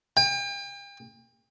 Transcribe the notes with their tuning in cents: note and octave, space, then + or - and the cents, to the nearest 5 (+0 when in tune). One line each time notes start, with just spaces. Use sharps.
G5 +40